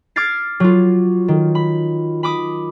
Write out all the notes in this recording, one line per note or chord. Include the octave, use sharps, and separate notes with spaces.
D6 F6 G#6 A6 C7
F#3 F4
D#3
B5
B5 D6 D#6